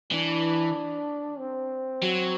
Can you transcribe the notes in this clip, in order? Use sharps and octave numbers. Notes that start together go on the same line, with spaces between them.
E3 D4
C4
F#3